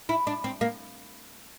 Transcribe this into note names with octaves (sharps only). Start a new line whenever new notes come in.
E4
D4
C4
A#3